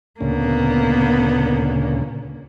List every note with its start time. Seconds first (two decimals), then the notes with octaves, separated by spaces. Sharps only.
0.21 D2 A#2 C#3 A#3 B3